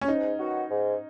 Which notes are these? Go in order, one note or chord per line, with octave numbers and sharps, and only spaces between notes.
C#4
G#2 D#4
D#3 F#3 B3 F#4
G#2